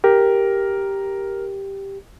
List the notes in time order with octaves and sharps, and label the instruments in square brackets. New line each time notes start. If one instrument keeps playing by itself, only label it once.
[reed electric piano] G4 [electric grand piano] A#4